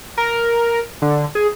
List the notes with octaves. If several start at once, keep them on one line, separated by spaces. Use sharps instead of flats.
A#4
D3
G#4